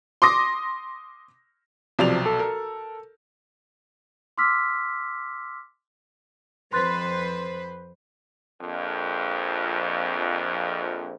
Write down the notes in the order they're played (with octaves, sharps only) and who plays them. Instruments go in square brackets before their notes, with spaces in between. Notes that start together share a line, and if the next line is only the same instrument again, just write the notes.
[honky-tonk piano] C6 D6 D#6 A#6
[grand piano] B1 D5 F7 [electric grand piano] C3 F3
[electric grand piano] A4
[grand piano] A#4
[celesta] C6 D6 E6 F6 B6
[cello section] F2 B4 C5 [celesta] C6 F#6 A6
[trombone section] A#1 F2